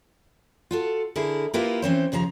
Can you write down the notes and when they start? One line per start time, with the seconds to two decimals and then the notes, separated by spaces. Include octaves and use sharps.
0.71 F4 F#4 A4
1.16 D3 E4 G#4 A#4
1.54 A#3 E4 F4 G4 A#4 B4
1.82 E3 C4 C#4 C5
2.12 D#2 C#3 F3 A5 A#5